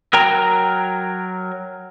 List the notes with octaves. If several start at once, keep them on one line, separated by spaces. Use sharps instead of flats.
F#3 A#4 G5 A#5